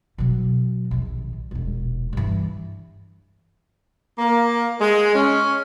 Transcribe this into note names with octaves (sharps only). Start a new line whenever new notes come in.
B2 F#3
A#1 D#2
E1 A#1
G2 E3
A#3
G#3
C#4